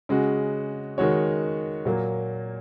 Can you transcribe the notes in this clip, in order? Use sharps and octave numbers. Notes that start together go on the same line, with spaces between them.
C#3 G#3 F#4
D#3 G#3 F#4 C#5
A#2 F#3 A#3